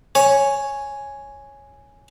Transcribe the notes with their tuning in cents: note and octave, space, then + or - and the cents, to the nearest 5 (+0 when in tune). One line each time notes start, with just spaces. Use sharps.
C#5 +0 G#5 +0